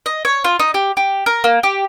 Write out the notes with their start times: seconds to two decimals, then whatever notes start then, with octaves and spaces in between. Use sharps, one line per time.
0.06 D#5
0.25 C#5
0.44 F4
0.59 D#4
0.74 G4
0.97 G4
1.26 A#4
1.44 A#3
1.63 G4